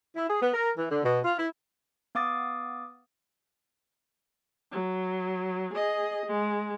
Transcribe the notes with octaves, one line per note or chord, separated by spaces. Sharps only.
E4
G#4
B3
A#4
E3
D3
B2
F4
E4
B3 F5 D6 D#6 A6
F#3
G#4 D#5
G#3